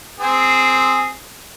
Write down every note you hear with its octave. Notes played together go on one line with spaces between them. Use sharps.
C4 G#4